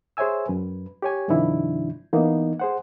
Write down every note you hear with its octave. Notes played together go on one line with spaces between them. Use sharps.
G#4 C5 C#5 E5 G#5 E6
F#2 B4
G4 C#5 G#5
G2 C3 D#3 F3 D4 E4
E3 A#3 B3 D#4
G#4 C5 F#5